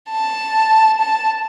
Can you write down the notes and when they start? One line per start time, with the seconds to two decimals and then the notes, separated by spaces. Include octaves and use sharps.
0.10 A5
1.00 A5